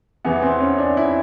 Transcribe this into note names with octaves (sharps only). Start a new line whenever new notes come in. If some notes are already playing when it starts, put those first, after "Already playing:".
E2 C3 E3 B3
C4
C#4
D4
E4